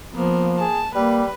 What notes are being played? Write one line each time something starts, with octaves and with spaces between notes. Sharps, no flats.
F3 A#3 B3
G#4 A5
G3 A#3 B4